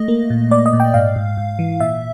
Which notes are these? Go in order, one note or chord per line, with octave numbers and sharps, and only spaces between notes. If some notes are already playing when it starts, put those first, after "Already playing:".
Already playing: A3 D#5
A#3
A#2
A#3 D5
D#5
A#2
G5
G#2 F5
G#2
G#2
E3
A#2 E5